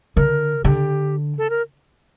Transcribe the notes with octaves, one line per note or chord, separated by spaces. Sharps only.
D3 A#4
D3 G4
A4
A#4